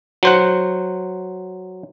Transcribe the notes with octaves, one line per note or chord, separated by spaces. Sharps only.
F#3 C5 F#5